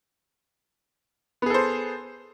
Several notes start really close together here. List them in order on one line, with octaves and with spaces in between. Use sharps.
B3 G#4 A4 C5